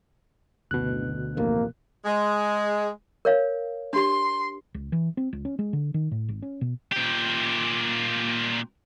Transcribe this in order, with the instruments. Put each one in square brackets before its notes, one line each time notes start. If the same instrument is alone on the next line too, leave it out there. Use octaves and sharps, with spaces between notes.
[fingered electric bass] F#1 [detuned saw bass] D2 [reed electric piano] B2 F#6
[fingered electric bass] A1 F2 [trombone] A#3
[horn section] G#3
[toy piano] A#4 C#5 F5
[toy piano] D4 G4 [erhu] C6
[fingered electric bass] C#2
E3
C4
C#2
C#4
G#3
D3
D#3
A2
G#1
C#4
B2
[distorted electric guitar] A#2 G4